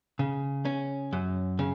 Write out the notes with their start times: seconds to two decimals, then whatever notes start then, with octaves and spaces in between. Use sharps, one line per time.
0.19 C#3
0.65 C#4
1.13 F#2
1.59 C#3